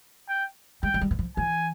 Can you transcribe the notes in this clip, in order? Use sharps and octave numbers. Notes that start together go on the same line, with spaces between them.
G5
G#3 G5
F#3
G3
E3
F3
E3 G#5